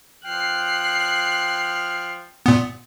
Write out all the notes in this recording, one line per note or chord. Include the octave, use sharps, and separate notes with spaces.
F3 G5 F6 F#6 C7
A#2 B3